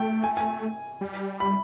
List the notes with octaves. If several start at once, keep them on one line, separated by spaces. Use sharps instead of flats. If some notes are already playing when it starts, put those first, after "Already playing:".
Already playing: A3 G5
G#5
G#5
G3
B5